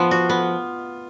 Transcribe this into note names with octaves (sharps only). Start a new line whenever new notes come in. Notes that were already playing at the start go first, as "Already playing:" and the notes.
Already playing: F3 B3 F4
F#4
B3